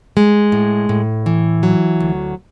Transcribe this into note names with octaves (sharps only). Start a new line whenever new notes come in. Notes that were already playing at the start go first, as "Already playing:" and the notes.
G#3
A2
A2
E3
F#3
D2